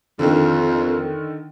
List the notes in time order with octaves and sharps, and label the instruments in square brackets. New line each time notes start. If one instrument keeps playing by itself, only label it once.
[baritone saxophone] F2 [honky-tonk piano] D3 D#3